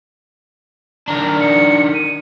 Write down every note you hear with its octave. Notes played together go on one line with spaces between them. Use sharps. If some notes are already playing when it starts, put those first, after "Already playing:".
D#3 D4 A#5
C#7
D#7